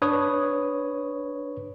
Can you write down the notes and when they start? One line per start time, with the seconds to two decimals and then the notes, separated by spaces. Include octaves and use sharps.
0.02 D4 B4 C#5 D#6